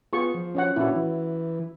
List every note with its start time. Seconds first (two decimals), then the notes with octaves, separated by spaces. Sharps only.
0.13 B3 F4 G#4 C#6
0.34 F3
0.55 C#4 C#5 F#5
0.76 A#2 C#4 D4 E4 F#4
0.96 E3